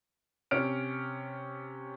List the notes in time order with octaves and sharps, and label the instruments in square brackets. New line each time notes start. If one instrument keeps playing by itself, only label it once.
[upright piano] C3 C#4 F6 D7